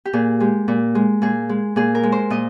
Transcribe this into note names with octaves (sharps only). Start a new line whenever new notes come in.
G4
A#2 G#4
G#3 G4
A#2
G#3
A#2 G#4
G#3
A#2 G#4
A#4
G#3
C5
A#2 D#5